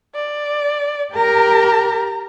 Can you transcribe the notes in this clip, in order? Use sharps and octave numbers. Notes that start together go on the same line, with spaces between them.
D5
G4 A#4 A#5